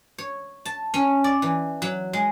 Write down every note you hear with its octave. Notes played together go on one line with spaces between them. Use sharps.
C#5
A5
C#4
D5
E3
F#3
G#3